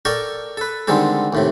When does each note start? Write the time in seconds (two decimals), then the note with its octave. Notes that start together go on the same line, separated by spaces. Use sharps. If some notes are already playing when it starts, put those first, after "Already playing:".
0.05 A4 A#4 D5 G5 A#5 C#6
0.57 A4 B4
0.87 D3 D#3 G3 G#3 C4 A4
1.33 D#2 A2 C3